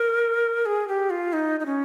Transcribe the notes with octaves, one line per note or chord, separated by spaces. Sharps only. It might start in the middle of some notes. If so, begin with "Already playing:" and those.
Already playing: A#4
G#4
G4
F4
D#4
D#4
C#4